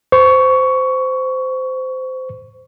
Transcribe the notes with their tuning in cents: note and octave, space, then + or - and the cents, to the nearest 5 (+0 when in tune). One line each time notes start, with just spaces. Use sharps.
C5 -20 C#6 +15